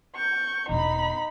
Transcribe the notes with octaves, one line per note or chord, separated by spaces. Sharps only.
C#6 G6
E1 B2 D#4 B5